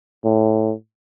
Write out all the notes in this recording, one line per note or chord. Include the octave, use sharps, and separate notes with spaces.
A2